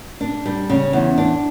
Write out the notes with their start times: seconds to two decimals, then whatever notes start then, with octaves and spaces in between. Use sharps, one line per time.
0.21 D4
0.46 G3
0.70 C#3
0.93 E2
1.18 D4